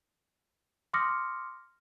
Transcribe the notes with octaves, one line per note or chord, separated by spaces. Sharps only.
C6 D6 D#6 F6 A#6 C#7